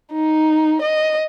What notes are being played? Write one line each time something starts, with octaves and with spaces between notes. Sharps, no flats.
D#4
D#5